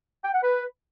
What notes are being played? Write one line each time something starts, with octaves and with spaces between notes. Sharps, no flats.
G5
F#5
B4